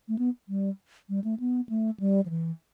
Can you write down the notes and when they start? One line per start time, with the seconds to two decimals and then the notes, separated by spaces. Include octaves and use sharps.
0.08 A3
0.19 B3
0.49 G3
1.09 G3
1.24 A3
1.40 B3
1.69 A3
2.00 G3
2.26 F3
2.30 E3